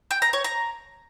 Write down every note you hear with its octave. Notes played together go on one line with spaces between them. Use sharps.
G5
A#5
C#5
A#5